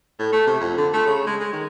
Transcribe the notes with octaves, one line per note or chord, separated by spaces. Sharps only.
A2
A3
C3
F2
D3
A3
C#3
G#3
G#3
D#3